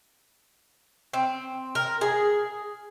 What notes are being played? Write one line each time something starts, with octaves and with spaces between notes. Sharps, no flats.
C4
A#4
G#4